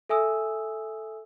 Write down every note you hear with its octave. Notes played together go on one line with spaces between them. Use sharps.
A4 E5 G#5 D#6 E6